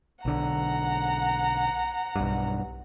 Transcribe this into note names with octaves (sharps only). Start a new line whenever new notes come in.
B1 D3 F#5 A#5
B1 G2